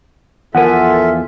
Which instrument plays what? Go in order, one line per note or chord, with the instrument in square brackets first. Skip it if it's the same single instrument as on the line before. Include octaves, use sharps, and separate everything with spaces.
[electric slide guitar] E2 F3 G#5 [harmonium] F4 A4 E5 [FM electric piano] A#4 F#5